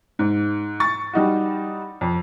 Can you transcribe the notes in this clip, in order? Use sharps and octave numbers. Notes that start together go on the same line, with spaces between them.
G#2
C#6 A6
G3 D#4 F#4
F2